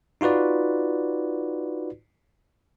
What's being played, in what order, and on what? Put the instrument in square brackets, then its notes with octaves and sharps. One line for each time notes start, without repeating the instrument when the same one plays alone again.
[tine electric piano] D#4 F4 F#4 B4 D5